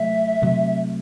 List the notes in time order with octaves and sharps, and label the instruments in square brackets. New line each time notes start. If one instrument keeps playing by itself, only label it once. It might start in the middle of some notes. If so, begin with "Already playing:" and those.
Already playing: [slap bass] C3 F#3 A3 [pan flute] E5
[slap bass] C3 F#3 A3